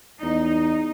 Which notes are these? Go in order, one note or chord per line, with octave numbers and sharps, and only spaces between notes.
E2 D#4